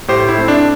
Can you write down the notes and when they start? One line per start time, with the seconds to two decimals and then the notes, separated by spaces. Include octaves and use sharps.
0.08 A2 G4 C5
0.29 E4
0.38 A3 C4
0.48 D4